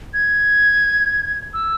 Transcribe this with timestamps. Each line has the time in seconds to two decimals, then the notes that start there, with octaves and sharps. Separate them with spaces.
0.14 G#6
1.54 E6